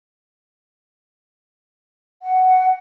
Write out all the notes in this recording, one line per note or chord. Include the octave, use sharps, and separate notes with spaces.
F#5